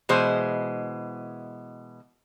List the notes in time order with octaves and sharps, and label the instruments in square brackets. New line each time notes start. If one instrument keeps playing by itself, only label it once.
[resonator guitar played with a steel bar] B2 E3 G#3 C5